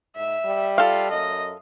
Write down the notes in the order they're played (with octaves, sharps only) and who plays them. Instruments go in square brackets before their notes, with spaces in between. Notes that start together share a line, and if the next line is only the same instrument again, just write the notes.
[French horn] G#2 [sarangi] E5
[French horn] G3
[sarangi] F4 [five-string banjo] A4 F5
[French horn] F#2 [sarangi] D#5